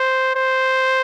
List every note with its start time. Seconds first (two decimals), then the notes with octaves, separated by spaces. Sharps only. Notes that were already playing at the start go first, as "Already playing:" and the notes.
Already playing: C5
0.35 C5